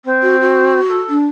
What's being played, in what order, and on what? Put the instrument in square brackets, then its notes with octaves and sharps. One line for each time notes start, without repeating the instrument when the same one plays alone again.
[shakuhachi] C4
[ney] F#4
F#4
[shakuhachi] A4
[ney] D4